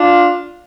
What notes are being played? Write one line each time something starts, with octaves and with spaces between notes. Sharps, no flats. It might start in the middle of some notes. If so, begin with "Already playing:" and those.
Already playing: D4 F4